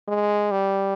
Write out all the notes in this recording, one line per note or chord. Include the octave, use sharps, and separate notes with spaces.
G#3
G3